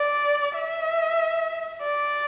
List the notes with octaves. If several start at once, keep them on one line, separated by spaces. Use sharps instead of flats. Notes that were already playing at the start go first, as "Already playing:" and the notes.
Already playing: D5
E5
D5